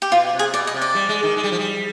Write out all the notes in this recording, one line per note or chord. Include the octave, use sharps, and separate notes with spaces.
G4
B2 F4
C3
G#4
B2 D5
D#5
C3
D5
G3
G#3
D#3
G#3
G3
F3
G3